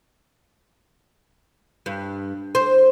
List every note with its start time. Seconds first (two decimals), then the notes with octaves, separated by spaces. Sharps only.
1.86 G2
2.55 C5